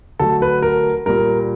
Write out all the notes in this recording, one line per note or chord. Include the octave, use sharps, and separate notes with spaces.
D3 F#3 A3 A4
B4
A#4
A#2 G3 A#4